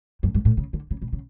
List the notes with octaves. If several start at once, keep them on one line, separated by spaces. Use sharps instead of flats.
F#2
G2
A2
C#3
D3
C#3
B2
C#3